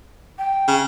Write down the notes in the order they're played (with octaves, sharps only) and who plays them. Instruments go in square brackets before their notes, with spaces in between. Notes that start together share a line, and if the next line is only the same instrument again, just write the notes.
[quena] G5
[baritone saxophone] C#3